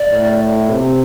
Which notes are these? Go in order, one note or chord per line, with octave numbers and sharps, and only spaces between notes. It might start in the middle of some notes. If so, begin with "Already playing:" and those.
Already playing: D5
A2
C3